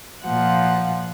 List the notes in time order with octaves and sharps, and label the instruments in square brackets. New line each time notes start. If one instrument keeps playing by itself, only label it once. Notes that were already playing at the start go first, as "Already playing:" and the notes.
[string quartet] A#2 F3 F#5